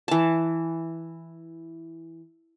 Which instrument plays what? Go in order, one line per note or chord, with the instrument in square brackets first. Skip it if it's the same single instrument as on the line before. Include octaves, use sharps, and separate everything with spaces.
[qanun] E3 A5